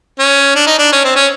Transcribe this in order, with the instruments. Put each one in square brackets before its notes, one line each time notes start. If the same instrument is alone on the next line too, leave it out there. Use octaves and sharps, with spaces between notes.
[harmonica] C#4
D4
D#4
D4
C#4
C4
C#4